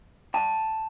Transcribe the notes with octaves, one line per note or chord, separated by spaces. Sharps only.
G5 A5